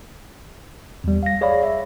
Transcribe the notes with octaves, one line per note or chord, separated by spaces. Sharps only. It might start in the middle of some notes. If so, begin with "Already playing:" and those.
E2 G3
F5 A#6
G#4 C#5 D5 F5 B5
E5